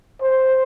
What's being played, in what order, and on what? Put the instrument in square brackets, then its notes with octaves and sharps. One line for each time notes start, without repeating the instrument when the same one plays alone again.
[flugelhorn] C5